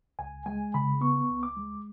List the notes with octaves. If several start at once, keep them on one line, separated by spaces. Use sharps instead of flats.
C#2 G#5
G#3 G#5
C#3 B5
B3 C#6
C#2
D6
G#3